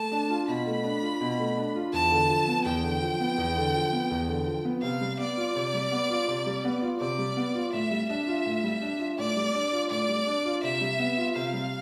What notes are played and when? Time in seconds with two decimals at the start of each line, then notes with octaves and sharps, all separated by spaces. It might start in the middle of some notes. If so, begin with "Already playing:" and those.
Already playing: A3 A5
0.12 D4
0.30 F4
0.48 B2 B5
0.66 A3
0.84 D4
1.02 F4
1.21 B2
1.39 A3
1.57 D4
1.75 F4
1.93 E2 A5
2.11 D3
2.29 F3
2.48 B3
2.65 E2 G5
2.84 D3
3.02 F3
3.20 B3
3.38 E2
3.56 D3
3.74 F3
3.93 B3
4.11 E2
4.28 D3
4.47 F3
4.65 B3
4.82 C3 F5
5.01 G3
5.19 B3 D5
5.37 F4
5.55 C3
5.74 G3
5.92 B3
6.10 F4
6.28 C3
6.46 G3
6.65 B3
6.82 F4
7.01 C3 D5
7.19 G3
7.37 B3
7.55 F4
7.73 A2 E5
7.91 G3
8.09 D4 E5
8.28 F4
8.46 A2
8.64 G3
8.81 D4
8.99 F4
9.18 A2 D5
9.36 G3
9.54 D4
9.72 F4
9.90 A2 D5
10.08 G3
10.27 D4
10.45 F4
10.63 C3 E5
10.81 G3
10.99 B3
11.18 F4
11.35 C3 F5
11.53 G3